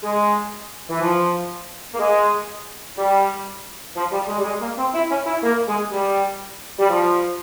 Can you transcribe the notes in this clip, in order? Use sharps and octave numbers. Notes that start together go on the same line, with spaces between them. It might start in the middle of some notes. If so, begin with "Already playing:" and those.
G#3
E3
F3
A#3
G#3
G3
F3
G3
G#3
G3
G#3
A#3
C4
E4
C#4
E4
A#3
G#3
G3
G3
F3